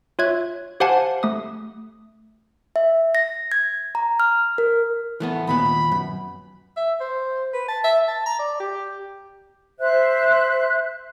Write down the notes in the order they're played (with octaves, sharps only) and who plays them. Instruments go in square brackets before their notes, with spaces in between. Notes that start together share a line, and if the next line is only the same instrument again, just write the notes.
[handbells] F4 C#5 E5 F#6 G#6
G4 C5 F5 F#5 G#5 A5
A3 D#6
[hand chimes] E5
A#6
G#6
A#5
F6
A#4
[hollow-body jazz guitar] E3 A3 B3
[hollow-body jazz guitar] D#2 A#2 B3 [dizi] B5
[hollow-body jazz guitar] F#2
[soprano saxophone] E5
C5
B4
A5
E5
A5
A#5
D5
G4
[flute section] C5 E5 F#6